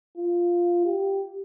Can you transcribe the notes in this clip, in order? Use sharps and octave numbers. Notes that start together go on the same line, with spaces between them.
F4
G4